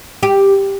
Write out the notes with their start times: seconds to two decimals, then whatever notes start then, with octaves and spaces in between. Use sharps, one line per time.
0.23 G4